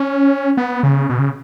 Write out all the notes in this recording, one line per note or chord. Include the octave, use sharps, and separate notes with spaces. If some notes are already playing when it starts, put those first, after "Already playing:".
Already playing: C#4
B3
C#3
B2
C#3